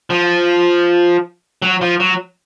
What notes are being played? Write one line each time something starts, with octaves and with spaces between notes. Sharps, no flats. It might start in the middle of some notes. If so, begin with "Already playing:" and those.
F3
F#3
F3
F#3